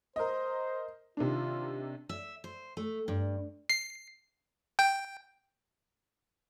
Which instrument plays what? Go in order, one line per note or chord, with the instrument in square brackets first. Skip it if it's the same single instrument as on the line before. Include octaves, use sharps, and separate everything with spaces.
[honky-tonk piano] A#4 D#5 [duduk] C5
[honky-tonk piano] C3 D#3 D4 [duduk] F4
[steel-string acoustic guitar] E5
C5
A3
G2
[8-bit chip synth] C7
G5